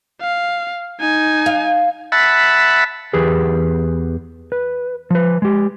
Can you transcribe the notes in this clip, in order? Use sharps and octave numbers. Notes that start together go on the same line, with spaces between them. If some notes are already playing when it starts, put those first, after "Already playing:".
F5
D#4 G#5
F5
E5 F#5 A5 B5
E2 E3 G4 G#4 B4
B4
F3 B4
G#3 G4